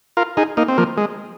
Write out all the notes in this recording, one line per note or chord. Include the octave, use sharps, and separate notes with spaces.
F4 A#4
D#4 G#4
A#3 D#4
C4
F3 A#3
G#3